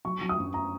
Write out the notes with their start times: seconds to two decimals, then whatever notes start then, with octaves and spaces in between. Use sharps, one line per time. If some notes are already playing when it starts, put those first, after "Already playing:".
0.05 F#3 C#6
0.21 F#3
0.29 D#6
0.38 F#2
0.54 A#5